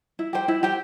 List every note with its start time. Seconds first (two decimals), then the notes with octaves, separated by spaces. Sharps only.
0.19 E4
0.33 G4 C5 G5
0.48 E4
0.63 G4 C5 G5